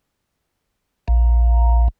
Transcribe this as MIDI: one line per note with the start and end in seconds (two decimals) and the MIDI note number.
1.08 1.88 34